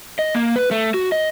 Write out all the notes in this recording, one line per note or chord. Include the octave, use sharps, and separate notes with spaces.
D#5
A#3
B4
A3
F#4
D#5